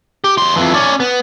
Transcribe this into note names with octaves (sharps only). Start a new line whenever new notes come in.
G4
E2 C6
F2 E3
C#4 D5
B3